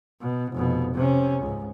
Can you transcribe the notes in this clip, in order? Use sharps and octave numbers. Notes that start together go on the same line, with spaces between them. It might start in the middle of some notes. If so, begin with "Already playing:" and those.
B2
F1 B2
C3 C#4
C#2 G#2